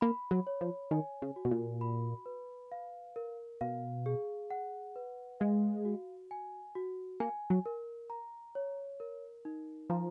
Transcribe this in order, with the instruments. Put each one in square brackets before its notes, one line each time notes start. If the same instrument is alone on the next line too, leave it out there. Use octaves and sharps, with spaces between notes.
[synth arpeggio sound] A#3 [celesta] B5
[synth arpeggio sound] F#3
[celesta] C#5
[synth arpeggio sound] F3
[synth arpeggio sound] D#3 [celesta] G#5
[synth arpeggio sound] C#3
[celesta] F#4
[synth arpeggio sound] B2
A#2
[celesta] B5
B4
F5
A#4
[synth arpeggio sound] B2 [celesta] F5
[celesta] G#4
F#5
B4
[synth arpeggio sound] G#3 [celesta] F5
[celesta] F#4
G#5
F#4
[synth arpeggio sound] A#3 [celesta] G#5
[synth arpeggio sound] F#3
[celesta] A#4
A#5
C#5
A#4
D#4
[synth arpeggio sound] F3 [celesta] A#5